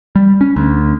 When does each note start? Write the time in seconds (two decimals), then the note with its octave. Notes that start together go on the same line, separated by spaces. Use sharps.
0.16 G3
0.41 C#4
0.56 D2